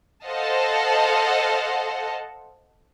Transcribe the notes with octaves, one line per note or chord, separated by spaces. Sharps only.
A4 C5 D#5 F5 F#5 A5